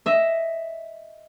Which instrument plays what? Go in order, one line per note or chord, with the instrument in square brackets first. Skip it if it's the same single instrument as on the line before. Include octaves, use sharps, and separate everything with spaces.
[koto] D#5 E5